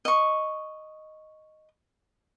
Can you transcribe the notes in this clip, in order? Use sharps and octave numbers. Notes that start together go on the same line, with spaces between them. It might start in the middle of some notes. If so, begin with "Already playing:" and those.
D#5 C#6